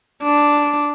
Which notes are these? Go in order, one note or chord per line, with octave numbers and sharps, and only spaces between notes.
D4